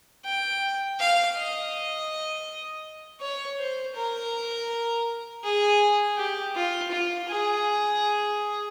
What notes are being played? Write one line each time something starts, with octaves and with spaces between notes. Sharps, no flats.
G5
F5
D#5
C#5
C5
A#4
G#4
G4
F4
F4
G#4